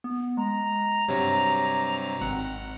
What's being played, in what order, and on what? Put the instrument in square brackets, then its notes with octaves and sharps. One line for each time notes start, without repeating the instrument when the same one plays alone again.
[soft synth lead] B3
[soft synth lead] G#3 [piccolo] A#5
[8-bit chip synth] G2 C3 F#3 [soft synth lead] C#5
[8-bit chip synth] G#1 F#5 [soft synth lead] C4